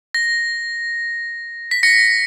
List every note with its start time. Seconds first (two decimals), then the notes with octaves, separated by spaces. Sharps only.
0.14 A#6
1.71 B6
1.83 A#6 C#7